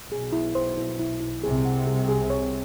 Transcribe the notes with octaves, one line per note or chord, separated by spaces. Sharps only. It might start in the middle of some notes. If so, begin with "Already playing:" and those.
B1 B2 G#4
E4
C5
E4
E4
E4
C2 C3 G#4
F#5
G#4
G#4
C#5